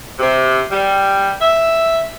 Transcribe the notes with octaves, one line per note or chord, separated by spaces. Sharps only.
C3
G3
E5